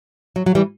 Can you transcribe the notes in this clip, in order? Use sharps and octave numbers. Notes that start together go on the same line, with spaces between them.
F#3
F#3
E3 G3